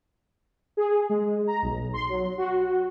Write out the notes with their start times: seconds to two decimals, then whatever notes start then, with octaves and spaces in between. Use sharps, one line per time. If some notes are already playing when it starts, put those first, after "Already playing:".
0.77 G#4
1.09 G#3
1.47 A#5
1.62 B1
1.93 C6
2.09 F#3
2.38 F#4